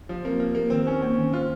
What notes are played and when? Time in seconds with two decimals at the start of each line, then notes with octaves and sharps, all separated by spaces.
0.09 F3 G4
0.24 A#3 C4
0.40 A#3 C4
0.55 A#3 G4
0.70 D#3 C4
0.87 C#4 D#4
1.02 A#3 C#4
1.18 D#3
1.33 F4 C5